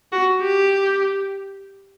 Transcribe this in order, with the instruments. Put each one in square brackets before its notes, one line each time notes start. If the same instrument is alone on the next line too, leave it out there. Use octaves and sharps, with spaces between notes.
[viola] F#4
G4